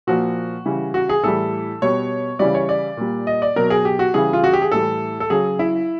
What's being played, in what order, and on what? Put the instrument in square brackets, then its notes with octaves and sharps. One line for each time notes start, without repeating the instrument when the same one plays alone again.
[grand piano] A#2 F3 F#4
C#3 E3 G3
F#4
G#4
A2 E3 G3 A4
B2 G3 C#5
C#3 E3 G3 D5
C#5
D5
A#2 G3
D#5
D5
B2 F#3 A#4
G#4
G4
F#4
C#3 E3 G3 G#4
F4
F#4
G4
G#4
A2 E3 G3 A4
A4
C#3 F#3 G#4
E4